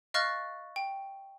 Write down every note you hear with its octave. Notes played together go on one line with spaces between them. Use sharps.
D#5 F5 C#6 F6 F#6 A6
G5